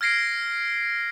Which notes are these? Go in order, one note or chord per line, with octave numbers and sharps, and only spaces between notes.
F6 G#6 A#6 C7 D7